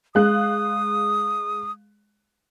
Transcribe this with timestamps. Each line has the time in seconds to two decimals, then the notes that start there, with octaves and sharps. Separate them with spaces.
0.15 G#3 F5 D#6 F#6